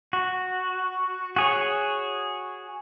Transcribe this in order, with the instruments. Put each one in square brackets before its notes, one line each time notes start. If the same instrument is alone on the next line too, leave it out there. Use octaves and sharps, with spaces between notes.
[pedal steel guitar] F#4
F#4 G#4 C#5